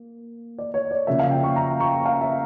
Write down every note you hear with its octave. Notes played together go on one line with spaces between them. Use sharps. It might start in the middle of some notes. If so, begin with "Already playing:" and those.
Already playing: A#3
D5
C#5
D5
C#3 F3 A#3 E5
F5
G5
C#6
A#5
C#6
F5
E5